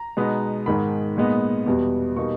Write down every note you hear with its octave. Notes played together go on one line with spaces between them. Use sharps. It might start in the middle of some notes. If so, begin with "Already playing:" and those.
Already playing: A#5
B2 G#3 B3 D#4
G#2 D#3 G#3 B5
A#2 G#3 B3 D#4
E2 B2 G3
B2 G3 A#3 D#4 C#6